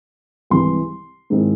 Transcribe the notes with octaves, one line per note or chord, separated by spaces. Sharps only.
C2 C3 E3 G#3 C6
G#2 D#3 G#3 C4 E4